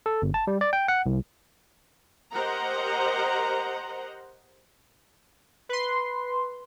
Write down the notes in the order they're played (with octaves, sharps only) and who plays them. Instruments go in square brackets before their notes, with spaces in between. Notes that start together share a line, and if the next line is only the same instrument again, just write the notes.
[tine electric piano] A4
G1
A5
G3
D5
G5
F#5
C2
[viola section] G4 A#4 C5 D#5 F#5 A#5
[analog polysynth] B4 C6